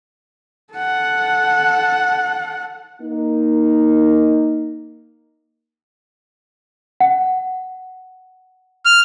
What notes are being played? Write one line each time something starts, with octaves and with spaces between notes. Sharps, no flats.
A4 F#5
A#3 D#4
F#5
F6